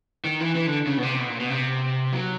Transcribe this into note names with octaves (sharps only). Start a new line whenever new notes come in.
D#3
E3
E3
D3
C#3
B2
C3
B2
A#2
B2
C3
F#3